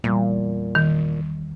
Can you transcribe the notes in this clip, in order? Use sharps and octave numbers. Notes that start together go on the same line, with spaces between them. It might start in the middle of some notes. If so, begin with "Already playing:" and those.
E2 A#2 G3
D#3